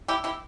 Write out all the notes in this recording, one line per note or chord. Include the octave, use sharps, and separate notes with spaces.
E4 G4
E4 G4